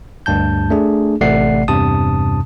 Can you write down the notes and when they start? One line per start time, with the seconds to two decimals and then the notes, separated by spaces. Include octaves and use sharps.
0.26 D2 G2 A5 G6
0.70 A3 D4 G#4
1.21 A1 C3 A3 D5 F#5 C7
1.68 E2 G2 C3 A5 D#6